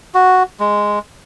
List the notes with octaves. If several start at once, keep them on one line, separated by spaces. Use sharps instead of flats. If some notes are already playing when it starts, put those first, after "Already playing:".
F#4
G#3